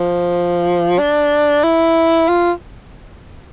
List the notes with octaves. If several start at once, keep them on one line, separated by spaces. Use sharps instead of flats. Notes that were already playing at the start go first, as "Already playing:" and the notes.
Already playing: F3
D4
E4
F4